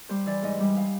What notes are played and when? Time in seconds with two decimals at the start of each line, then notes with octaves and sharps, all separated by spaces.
0.09 G3 C5
0.26 E3 D5
0.43 G#2 D#5
0.60 G3
0.76 F5